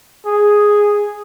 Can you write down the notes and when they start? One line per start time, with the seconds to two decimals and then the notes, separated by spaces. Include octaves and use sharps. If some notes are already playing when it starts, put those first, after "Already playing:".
0.26 G#4